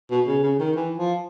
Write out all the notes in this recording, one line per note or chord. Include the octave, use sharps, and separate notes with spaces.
B2
C#3
C#3
D#3
E3
F3